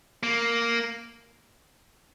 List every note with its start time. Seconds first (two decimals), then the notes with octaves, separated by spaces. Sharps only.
0.23 A#3